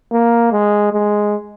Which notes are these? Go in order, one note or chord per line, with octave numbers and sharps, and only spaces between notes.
A#3
G#3
G#3